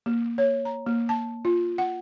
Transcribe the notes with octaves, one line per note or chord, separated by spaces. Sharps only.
A#3
C#5
A#5
A#3
A5
F4
F#5